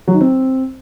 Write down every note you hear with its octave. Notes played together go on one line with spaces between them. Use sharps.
F#3
D#3
C4